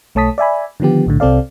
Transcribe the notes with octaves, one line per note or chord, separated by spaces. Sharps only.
B1 A3 C#5 A5 D#6 B6
D5 E5 G#5 B5
D3 D#3 F3 B3 G4
B1 A2 D3
C2 C3 C4 A4 D5 F5